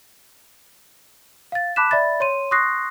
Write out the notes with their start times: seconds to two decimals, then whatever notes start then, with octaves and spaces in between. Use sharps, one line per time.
1.52 F5 A6
1.76 A5 B5 D6 F#6 B6 E7
1.91 D5 E5 B5 A6
2.20 C#5 C6 D#7
2.51 C6 C#6 D#6 F#6 A#6 C7